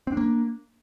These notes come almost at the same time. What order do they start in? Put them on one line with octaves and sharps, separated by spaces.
C4 D4 A#3